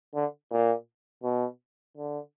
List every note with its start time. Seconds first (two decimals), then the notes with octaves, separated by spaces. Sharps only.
0.15 D3
0.51 A#2
1.23 B2
1.97 D3